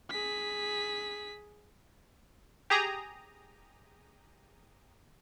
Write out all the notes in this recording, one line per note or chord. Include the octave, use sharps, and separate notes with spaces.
G#4 B6
G4 G#4 A#5 D#6